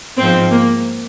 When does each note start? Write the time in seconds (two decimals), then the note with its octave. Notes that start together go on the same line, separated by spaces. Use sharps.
0.17 G#2 F3 C4
0.51 A#3